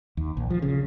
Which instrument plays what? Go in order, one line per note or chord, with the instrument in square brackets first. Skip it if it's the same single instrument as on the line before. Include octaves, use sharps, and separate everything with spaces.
[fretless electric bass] D#2
A#1
F3
C#3